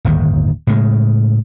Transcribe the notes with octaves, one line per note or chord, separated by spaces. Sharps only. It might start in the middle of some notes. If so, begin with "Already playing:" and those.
D1 G1 D#2 D#3
A2 C#3 G#3